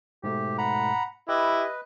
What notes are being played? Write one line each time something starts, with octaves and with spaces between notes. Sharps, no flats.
G#2 B2 A3 G4
F#5 A#5 B5
E4 G4 B4 D#5